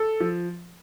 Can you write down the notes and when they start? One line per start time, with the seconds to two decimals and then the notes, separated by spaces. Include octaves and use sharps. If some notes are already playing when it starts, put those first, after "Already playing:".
Already playing: A4
0.20 F3